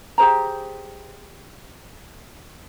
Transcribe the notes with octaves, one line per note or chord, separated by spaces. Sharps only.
G4 G#4 C5 A#5